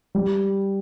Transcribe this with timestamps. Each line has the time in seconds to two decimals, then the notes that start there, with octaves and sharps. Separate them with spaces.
0.15 G3